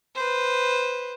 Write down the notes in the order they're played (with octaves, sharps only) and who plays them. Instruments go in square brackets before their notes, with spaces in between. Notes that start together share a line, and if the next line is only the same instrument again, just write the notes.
[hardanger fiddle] B4 C5